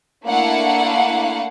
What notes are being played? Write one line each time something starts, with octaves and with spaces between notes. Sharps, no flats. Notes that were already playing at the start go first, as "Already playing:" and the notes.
A3 A#3 D4 E4 F5 F#5